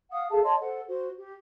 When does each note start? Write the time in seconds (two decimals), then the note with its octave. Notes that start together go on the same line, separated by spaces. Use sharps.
0.11 F5 F#5 D#6
0.31 G#4 A4 F5 A5
0.44 C#5 D#5 A5 C6
0.60 A4 C5 F#5
0.87 F#4 C5
1.17 G4